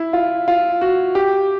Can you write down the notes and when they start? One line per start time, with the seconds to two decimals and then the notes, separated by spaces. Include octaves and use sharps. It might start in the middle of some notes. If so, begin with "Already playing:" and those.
Already playing: E4
0.13 F4
0.48 F4
0.81 F#4
1.15 G4